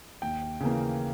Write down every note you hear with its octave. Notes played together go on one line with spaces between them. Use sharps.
D#2 G5
C#3 E3 A#3